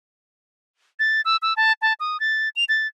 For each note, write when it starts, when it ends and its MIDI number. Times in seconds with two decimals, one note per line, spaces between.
0.99 1.21 93
1.25 1.37 88
1.42 1.54 88
1.57 1.73 81
1.82 1.93 81
2.00 2.20 87
2.20 2.49 93
2.56 2.64 101
2.69 2.87 93